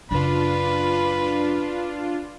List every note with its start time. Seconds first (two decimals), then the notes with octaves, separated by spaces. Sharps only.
0.11 F#2 C#3 D4 F4 B4